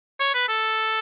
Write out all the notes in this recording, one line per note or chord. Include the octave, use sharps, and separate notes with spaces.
C#5
B4
A4